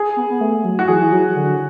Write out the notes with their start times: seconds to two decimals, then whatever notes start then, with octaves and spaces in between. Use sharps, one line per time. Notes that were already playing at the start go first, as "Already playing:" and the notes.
Already playing: G#4
0.17 B3
0.30 B3
0.41 A3
0.64 F#3
0.79 F#4
0.88 E3 G#4
1.01 E3
1.12 F#3
1.36 D3